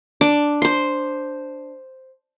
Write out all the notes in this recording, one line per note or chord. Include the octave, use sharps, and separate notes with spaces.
D4 D6
C5 C6